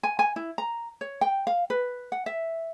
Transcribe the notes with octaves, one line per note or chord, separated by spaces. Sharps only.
G#5
G#5
E4
A#5
C#5
G5
F5
B4
F#5
E5